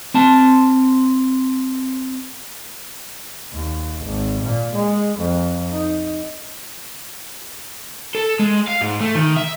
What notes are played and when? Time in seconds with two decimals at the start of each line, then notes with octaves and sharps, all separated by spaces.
0.14 C4 A5
3.53 D#2
4.05 G#1
4.43 A#2
4.75 G#3
5.19 F2
5.73 D#4
8.15 A4
8.39 G#3
8.67 F5
8.81 G#2
9.00 A3
9.15 D#3
9.37 E5